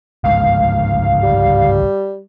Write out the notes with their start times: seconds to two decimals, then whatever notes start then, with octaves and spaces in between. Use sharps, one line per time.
0.24 G1 C#2 G#2 F5
1.23 G3